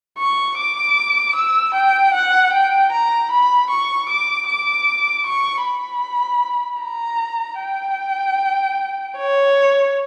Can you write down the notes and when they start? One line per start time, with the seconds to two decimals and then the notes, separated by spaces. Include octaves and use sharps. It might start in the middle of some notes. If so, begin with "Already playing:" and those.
0.18 C#6
0.58 D6
1.36 E6
1.74 G5
2.14 F#5
2.53 G5
2.92 A#5
3.31 B5
3.70 C#6
4.09 D6
4.48 D6
5.26 C#6
5.65 B5
6.82 A#5
7.61 G5
9.17 C#5